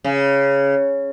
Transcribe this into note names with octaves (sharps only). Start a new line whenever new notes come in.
C#3